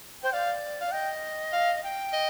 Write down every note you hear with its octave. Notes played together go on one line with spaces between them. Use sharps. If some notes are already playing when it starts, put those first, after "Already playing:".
C5 G5
D5 F5
F5
D5
D#5 G5
F5
G5
D#5